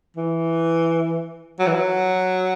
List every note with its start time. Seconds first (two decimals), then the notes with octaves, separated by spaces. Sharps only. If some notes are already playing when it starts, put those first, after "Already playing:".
0.17 E3
1.59 F#3
1.67 E3
1.74 F#3